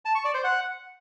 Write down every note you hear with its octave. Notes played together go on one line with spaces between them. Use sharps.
A5
C#6
D5
C5
F#5